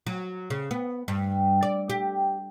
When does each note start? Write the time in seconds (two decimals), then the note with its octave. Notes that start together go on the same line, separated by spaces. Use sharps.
0.07 F#3
0.50 C#3
0.71 B3
1.08 G2
1.63 D5
1.90 G4